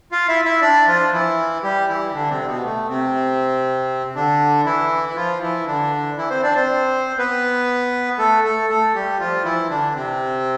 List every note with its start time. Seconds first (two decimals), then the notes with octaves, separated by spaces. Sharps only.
0.12 F4 F5
0.28 E4 E5
0.45 E4 E5
0.62 D4 D5
0.87 F3 F4
1.12 E3 E4
1.63 G3 G4
1.88 E3 E4
2.14 D3 D4
2.30 C3 C4
2.47 B2 B3
2.64 A3
2.89 C3 C4
4.16 D3 D4
4.65 E3 E4
5.09 E4
5.16 F3 F4
5.41 E3 E4
5.66 D3 D4
6.17 E3 E4
6.30 C4 C5
6.43 D4 D5
6.55 C4 C5
7.18 B3 B4
8.18 A3 A4
8.44 A3 A4
8.69 A3 A4
8.95 G3 G4
9.20 F3 F4
9.45 E3 E4
9.70 D3 D4
9.95 C3 C4